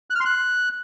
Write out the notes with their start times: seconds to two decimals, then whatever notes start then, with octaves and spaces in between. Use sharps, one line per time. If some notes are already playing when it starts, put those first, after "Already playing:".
0.10 F#6
0.15 F6
0.20 C6
0.25 F#6